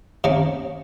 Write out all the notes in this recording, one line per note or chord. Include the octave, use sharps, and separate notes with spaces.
C3 D#3 A#3 C#4